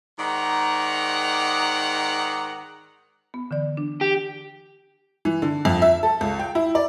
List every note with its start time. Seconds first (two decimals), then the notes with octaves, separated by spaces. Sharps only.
0.19 G#2 D#3 D#4 D5 F#5 A#5
3.34 B3
3.51 D3 E3 D5
3.77 D4
4.01 G4
5.25 E3
5.42 D3
5.65 F2
5.82 E5
6.03 A4
6.21 C#2
6.39 G5
6.55 E4
6.75 D5